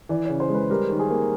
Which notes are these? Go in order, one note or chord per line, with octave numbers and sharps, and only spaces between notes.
E3 D5
C#3 C#5
C5
G#3 B4
G3 A#4
D#3
G#4
A#3